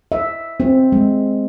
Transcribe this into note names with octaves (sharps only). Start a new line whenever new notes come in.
E5
C4
G#3